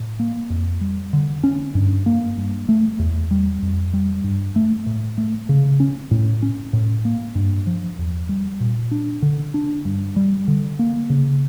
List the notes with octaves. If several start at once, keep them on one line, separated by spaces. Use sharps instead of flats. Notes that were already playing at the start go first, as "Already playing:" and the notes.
Already playing: A2
A#3
F2
G3
D3
C#4
G2
A#3
G2
A3
E2
G3
F2
G3
G2
A3
A2
A3
C#3
C#4
A2
C#4
A2
A#3
G2
F3
E2
G3
A#2
D4
D3
D4
G2
G3
D3
A#3
C#3